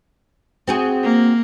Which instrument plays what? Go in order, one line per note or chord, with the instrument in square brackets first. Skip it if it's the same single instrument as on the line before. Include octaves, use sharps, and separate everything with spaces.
[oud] C4 F#4 G#4
[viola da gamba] A#3